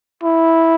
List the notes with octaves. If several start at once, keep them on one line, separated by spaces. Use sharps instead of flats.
E4